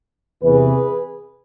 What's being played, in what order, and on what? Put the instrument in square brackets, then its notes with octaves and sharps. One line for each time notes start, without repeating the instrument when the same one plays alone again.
[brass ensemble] E2 C3 E3 G#4 B4